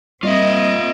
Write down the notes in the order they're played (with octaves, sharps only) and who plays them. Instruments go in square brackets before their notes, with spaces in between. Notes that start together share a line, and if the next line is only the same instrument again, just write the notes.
[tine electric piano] G3 [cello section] A#3 C4 D#5 [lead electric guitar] F4 E5